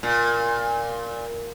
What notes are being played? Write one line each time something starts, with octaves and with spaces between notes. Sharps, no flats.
A#2